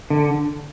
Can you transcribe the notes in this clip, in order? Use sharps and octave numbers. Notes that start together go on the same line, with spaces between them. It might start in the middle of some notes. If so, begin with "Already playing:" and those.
D3